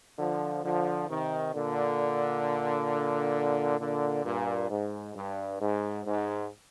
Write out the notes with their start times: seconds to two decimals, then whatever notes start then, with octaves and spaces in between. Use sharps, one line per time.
0.18 D3 F3
0.64 D3 F3
1.09 C3 D#3
1.54 A#2 D3
3.79 A#2 D3
4.25 G2 A#2
4.70 G#2
5.15 G2
5.60 G#2
6.05 G#2